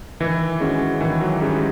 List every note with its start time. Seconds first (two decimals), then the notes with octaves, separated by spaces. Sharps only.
0.20 D#3 E3
0.60 G#3 C#4 F#4
1.01 D#3 E3
1.21 F#3
1.41 G3 G#3 C#4 F#4